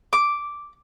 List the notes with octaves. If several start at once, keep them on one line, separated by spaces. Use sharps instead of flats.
D6